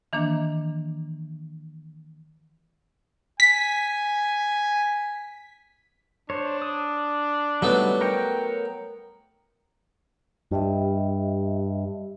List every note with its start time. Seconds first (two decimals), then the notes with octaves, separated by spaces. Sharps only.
0.13 D#3 E3 A#3 D4
3.40 G#5 B6
6.30 D4 C5 C#5
6.62 D#6
7.62 F#3 G3 A3 B3 D#4
8.01 A#4 C#5 G5
10.51 G2 G4 D#5 E5